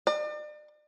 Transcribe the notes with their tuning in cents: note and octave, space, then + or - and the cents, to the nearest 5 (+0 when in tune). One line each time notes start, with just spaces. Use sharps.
D5 +40